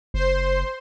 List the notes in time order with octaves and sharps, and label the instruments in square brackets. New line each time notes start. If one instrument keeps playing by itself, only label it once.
[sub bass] F#1 [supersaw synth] C5 C6